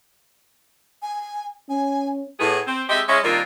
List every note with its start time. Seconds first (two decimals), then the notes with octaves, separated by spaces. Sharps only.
1.02 G#5
1.70 C#4 G#5
2.40 A2 B3 G#4
2.66 C4
2.89 G#3 C4 G4 A4 D#5 E5
3.07 G#3 C#4 E4
3.23 D#3 G3 A#3 C4 D4 F4